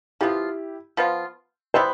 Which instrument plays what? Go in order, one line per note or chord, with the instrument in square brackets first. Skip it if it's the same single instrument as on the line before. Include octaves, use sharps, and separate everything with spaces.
[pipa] F3 B3 F4 [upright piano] E4 G4
[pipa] F3 B3 F4
[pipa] G3 B3 E4 B4 [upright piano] C5 E5